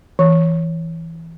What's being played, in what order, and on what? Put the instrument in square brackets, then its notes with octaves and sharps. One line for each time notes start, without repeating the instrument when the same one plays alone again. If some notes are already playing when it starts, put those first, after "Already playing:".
[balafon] E3